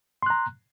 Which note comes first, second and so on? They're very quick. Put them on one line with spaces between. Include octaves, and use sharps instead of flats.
C6 F#6 A#5